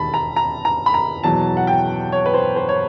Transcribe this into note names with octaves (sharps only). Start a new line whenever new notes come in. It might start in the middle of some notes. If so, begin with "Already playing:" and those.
Already playing: E1 D#2 D#3 A5 B5
A#5
A#5
A#5
B5
A#5
E2 B2 F#3 A5
F#5
G5
C#5
B4
C5
C5
C#5